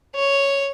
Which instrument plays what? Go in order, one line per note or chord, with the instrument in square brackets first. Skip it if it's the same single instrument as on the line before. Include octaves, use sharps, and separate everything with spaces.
[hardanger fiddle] C#5